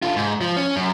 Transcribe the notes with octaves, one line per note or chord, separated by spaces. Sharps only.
D3 F4
G#2
F3
C#4
F#2